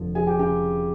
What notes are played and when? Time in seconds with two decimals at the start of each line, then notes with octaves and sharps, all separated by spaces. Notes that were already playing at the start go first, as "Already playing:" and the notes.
Already playing: F1 D3 F3 A4
0.15 F3 G#4 G#5
0.27 G4 G5
0.39 C#3 G4 G5